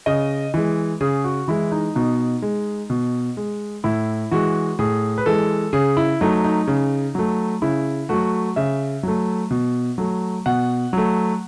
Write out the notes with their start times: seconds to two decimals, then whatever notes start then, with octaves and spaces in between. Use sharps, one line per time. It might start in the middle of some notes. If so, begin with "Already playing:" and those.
0.06 C#3 D#5
0.54 E3 G#3
1.01 C#3 G#4
1.24 F#4
1.48 E3 G#3 E4
1.72 D#4
1.95 B2 D#4
2.42 G#3
2.90 B2
3.37 G#3
3.84 A2 E4
4.31 E3 G#3 F#4
4.79 A2 G#4
5.18 B4
5.26 E3 G#3 A4
5.73 C#3 G#4
5.97 E4
6.21 F#3 A3 D#4
6.44 D#4
6.68 C#3
7.15 F#3 A3
7.62 C#3 E4
8.09 F#3 A3 F#4
8.56 C#3 E5
9.03 F#3 A3
9.51 B2
9.98 F#3 A3
10.46 B2 F#5
10.93 F#3 A3